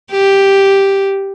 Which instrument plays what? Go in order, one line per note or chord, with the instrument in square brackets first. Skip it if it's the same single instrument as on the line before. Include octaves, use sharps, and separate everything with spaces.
[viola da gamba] G4